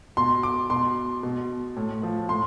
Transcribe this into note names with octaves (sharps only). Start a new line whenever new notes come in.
B2 C6
D6
B2 C6
B2
A2
F3
A2 C6